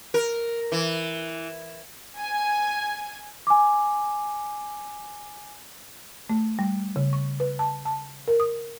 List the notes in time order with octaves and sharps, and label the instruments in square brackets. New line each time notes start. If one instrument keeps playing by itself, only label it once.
[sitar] A#4
E3
[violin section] G#5
[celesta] G#5 D6
[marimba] A3
G3
C#3
C#6
B4
A5
A5
A#4
D#6